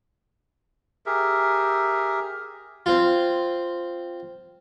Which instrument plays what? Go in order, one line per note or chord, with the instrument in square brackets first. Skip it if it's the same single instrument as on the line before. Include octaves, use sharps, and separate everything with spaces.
[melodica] G4 G#4 A#4 E5
[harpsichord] C4 F4